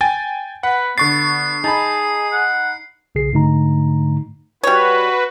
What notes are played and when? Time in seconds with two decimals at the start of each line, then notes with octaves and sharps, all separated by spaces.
0.01 G5 G#5 A6
0.63 B4 F#5
0.98 D3 B3 C#6 A6 C7
1.64 D#4 G#4 A5 B5
2.33 F#5
3.15 B1 C#3 G#4 C7
3.33 G#2 D3 A3 D#4 A#5
4.63 G3 F#4 B4 C#5